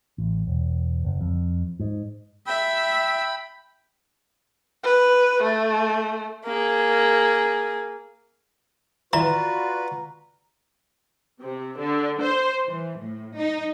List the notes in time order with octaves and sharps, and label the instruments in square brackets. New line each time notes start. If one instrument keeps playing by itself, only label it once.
[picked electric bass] A1
E1
F#1
F2
G#2
[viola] E5 [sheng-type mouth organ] G5 B5
[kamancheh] B4
A3
[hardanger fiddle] A#3 G#4
[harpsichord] E3 [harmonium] F4 F#4 B4 [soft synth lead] D5 [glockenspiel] A#5
[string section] C3
D3
C5
E3
A2
D#4